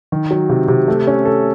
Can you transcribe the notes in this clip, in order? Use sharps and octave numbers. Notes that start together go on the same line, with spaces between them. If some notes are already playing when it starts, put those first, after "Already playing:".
D#3
F#3
C3
C3
A3
C#4
A4